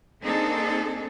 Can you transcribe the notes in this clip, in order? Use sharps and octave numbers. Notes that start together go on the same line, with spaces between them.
A#3 C4 D4 D#4 G#4 A4